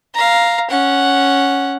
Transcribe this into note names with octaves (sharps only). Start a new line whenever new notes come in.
F5 A#5
C#4 F#5